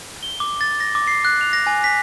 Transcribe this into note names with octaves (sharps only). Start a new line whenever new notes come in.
G7
D6
A6
A#6
D6
C7
F#6
F7
A#6
G#5
B6